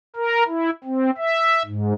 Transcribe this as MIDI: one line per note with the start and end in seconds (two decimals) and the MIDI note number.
0.16 0.43 70
0.48 0.70 64
0.84 1.10 60
1.17 1.62 76
1.66 1.93 44